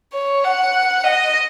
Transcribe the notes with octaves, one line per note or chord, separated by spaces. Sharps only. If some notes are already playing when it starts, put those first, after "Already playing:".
C#5
F#5
D#5